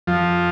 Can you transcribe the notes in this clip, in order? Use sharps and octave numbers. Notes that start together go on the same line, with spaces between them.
F2 F3